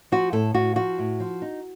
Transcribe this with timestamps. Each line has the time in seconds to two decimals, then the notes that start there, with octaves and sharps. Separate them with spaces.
0.12 F3 F#4
0.33 A2 A4
0.54 A2 F#4
0.76 F3 F#4
0.99 A2
1.20 F3
1.42 D#4